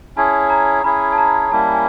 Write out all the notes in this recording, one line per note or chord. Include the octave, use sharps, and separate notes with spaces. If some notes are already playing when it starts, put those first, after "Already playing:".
C#4 E4 G#4 C#5 A5
A#5
C#4 E4 G#4 C#5 B5
A5
A#5
G3 A#3 C#4 E4 A5
G#5